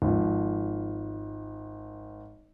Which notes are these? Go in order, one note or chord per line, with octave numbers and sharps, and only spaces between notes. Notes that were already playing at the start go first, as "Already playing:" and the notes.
G#1 F3